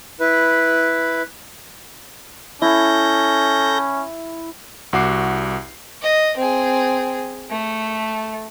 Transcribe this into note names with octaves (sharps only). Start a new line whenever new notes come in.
E4 B4
C#4 E4 A4 G6 A#6
C2 F#4 D6 C7
D#5
C4 G#4
A3